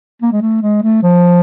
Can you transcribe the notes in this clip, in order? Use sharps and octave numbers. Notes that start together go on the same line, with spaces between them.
A#3
G#3
A3
G#3
A3
F3